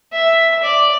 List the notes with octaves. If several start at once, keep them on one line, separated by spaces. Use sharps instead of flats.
E5
D5